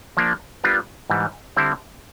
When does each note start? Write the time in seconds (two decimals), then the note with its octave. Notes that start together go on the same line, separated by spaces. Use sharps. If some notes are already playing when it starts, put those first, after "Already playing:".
0.17 F3 A#3 D4
0.64 G3 B3 D4 F4 A#4
1.10 G#2 E3 G3
1.56 D3 G3 C4 E4